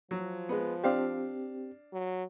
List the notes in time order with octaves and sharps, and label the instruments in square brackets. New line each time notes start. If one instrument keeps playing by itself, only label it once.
[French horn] F3 [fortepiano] F#3
[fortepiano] G#3 B3
[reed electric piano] C4 G4 [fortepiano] D4 F5
[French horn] F#3